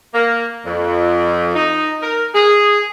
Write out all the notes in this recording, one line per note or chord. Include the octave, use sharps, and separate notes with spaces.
A#3
F2
D#4
A#4
G#4